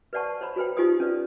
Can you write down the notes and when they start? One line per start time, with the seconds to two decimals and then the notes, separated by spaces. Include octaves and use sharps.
0.13 B4 C5 D5 F#5 A5 C#6
0.41 C5 C#5 A#5 B5
0.56 F#4 A4 B4 C5 G5
0.77 D#4 F4 G4 A4 C5 D#6
1.00 C#4 B4 D5